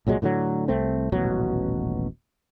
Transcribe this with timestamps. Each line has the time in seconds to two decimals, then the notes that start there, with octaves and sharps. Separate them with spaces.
0.07 C2 A#2 F#3 G#3
0.22 A2 D3 D#3 F#3
0.68 C2 A3 C4
1.12 D#1 A1 B2 F#3